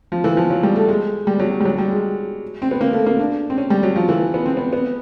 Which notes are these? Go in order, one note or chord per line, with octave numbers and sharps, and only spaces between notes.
F3
E3
F3
F#3
G3
A3
G#3
G3
F#3
G3
F#3
G3
G#3
C4
B3
A#3
A3
A#3
D4
C4
C#4
G3
F#3
F3
E3
B3
C4
B3
B3